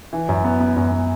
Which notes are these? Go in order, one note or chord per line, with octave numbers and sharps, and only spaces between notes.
E3
F#2
B3
B3
F#2
B3